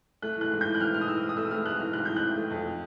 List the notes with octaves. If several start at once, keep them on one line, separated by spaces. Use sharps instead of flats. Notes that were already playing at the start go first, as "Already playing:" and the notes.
A3 F#6
E3 F#6
G#2
E3 G6
F#6
E3 F6
G#2 F6
D#6
E3 E6
G#2
D#6
A3 E6
A3 F6
G#2 F#6
E3 F6
G#2 F#6
E3 G6
F#6
E3
A3
F2